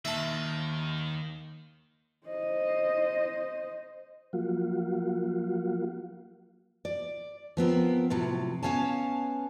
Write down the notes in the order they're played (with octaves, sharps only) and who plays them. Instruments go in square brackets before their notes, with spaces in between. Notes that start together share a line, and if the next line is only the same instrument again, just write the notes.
[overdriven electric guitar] D#2 [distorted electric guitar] D#3 [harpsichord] E5 A5
[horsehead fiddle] C5 D#5
[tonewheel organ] F3 F#3 A#3 F4 F#4
[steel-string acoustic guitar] D5
F3 B3 C4 A#4
A2 C3 F3 F#3
B3 C#4 C#5 F5 G#5 A5